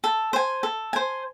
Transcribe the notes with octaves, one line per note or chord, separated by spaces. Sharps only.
A4
C5 G#5
A4
C5 G#5